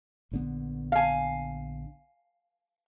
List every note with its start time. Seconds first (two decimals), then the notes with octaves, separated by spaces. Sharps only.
0.31 A#1 D3 B3
0.92 F5 G#5